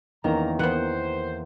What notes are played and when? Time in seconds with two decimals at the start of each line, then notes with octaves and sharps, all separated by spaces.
0.24 E2 D#3 A#3 C#4 A#5
0.59 E3 B3 C5 F#5